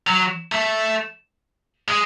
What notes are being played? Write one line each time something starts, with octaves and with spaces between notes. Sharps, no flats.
F#3
A3
G#3